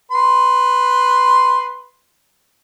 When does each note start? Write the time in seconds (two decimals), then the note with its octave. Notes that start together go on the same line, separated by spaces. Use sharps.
0.11 B4 C6